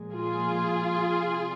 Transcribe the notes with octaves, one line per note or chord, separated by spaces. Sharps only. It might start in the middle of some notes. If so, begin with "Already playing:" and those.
Already playing: A#2 F3 G#3
F4 G#4
C3 G3